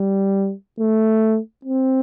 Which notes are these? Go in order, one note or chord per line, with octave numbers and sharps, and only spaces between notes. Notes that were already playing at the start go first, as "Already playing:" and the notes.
Already playing: G3
A3
C4